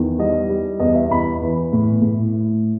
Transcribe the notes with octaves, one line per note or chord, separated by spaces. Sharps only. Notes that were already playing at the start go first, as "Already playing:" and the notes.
Already playing: E2 D#3
G3 D#5
G3
E2 D#5
E5
E2 B5
E3
A2
A2